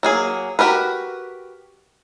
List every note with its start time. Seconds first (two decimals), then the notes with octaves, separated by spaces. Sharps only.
0.03 F#3 A#3 G#4
0.59 F#4 G4 A#4 B4